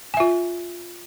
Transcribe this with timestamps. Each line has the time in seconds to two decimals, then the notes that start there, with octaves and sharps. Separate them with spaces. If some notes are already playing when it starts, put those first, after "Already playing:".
0.14 G#5
0.17 E5
0.20 F4